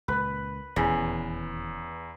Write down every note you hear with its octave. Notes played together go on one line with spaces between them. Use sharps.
C#2 A#2 B4
D#1 E2 C#3